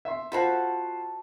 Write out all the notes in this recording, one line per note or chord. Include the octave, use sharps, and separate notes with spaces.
E5 C6
F4 F#4 A4 C5 F#5 B5